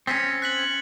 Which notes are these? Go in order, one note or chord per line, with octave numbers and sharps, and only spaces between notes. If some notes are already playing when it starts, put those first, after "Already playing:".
C4 C#4 A6 B6 C#7
F#6 B6 F#7